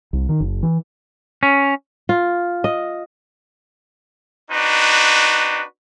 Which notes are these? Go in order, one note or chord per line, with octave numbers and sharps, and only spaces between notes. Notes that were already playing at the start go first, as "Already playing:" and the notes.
C2
D#3
F#1
E3
C#4
F4
D#5
C4 D4 D#4 F#4 B4